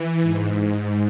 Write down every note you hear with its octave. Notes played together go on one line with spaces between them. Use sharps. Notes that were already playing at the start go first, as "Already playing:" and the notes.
Already playing: E3
G#2